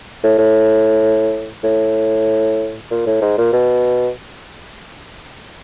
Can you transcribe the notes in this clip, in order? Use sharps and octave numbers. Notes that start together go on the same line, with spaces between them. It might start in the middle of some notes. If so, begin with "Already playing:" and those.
A2
A2
A2
A#2
A2
G#2
A#2
B2